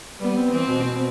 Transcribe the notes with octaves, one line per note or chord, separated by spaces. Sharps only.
G3 B3
C4
E3 C4
B2
B2